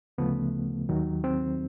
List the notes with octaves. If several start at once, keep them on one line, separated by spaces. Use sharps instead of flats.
D2 C#3 F3 A3 B3
D#2 D#3 F#3
C4